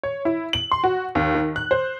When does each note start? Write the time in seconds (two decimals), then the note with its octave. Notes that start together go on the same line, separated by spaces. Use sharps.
0.03 C#5
0.25 E4
0.53 F#7
0.71 C6
0.84 F#4
1.15 D#2
1.35 D#3
1.56 F#6
1.71 C5